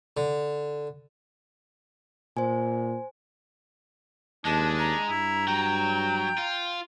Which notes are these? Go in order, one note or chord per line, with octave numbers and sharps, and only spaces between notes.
D3
A#2 C5 G#5
D#2 G#3 D4 A5
A#5
G2 E4
F#3 G5
F4